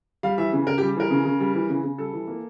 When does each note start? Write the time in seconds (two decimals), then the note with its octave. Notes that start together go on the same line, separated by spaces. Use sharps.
0.23 G3 F5
0.38 E3 E5
0.52 C#3
0.67 C#3 A#4
0.78 G4
0.82 G3
0.96 E3 A#4
1.10 C#3
1.25 C#3
1.40 G3
1.55 E3
1.69 C#3
1.84 C#3
1.98 G3 A4
2.13 E3
2.28 A#3